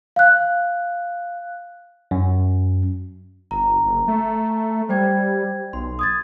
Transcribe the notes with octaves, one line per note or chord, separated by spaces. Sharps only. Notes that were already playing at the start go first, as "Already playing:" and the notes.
F5 F#6
F#2
G1 A#5
F#1
A3
G3 C5 G5 G#6
B1 C6
D#6 G#6 A6